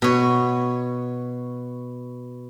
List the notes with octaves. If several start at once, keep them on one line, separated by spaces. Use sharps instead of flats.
B2 C#5